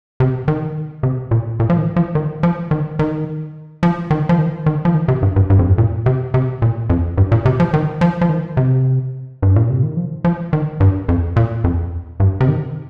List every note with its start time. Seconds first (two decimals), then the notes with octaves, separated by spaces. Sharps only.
0.20 C3
0.48 D#3
1.03 C3
1.31 A#2
1.60 A#2
1.70 F3
1.78 D#3
1.96 F3
2.15 D#3
2.43 F3
2.71 D#3
2.99 D#3
3.83 F3
4.11 D#3
4.29 F3
4.38 D#3
4.66 D#3
4.85 F3
4.95 D#3
5.08 C3
5.22 G2
5.36 G2
5.50 G2
5.59 F2
5.68 G2
5.78 A#2
6.06 C3
6.34 C3
6.62 A#2
6.90 F2
7.18 G2
7.32 A#2
7.45 C3
7.60 F3
7.74 D#3
8.01 F3
8.21 F3
8.29 D#3
8.57 C3
9.42 G2
9.56 A#2
9.70 C3
9.83 D#3
9.97 F3
10.24 F3
10.53 D#3
10.80 G2
11.08 F2
11.36 A#2
11.64 F2
12.20 G2
12.41 C3
12.48 D#3